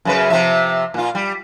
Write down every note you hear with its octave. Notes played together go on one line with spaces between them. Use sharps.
F#2 C#3 B4
C3 F3 E5
A#2 F4
G3